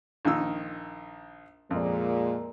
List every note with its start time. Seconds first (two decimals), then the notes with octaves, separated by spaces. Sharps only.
0.25 A#1 D#3 E6
1.71 F2 A#2 G#3